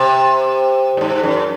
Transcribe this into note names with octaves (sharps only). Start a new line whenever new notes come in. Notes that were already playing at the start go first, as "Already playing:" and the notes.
Already playing: C3
A2
G#2
F#2